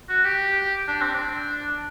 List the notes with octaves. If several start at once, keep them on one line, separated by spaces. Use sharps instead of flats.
F#4
G4
D4
C4
D4